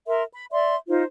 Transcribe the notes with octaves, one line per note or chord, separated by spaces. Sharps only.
A#4 E5 C6
B5
D5 E5 C6
D#4 F4 C5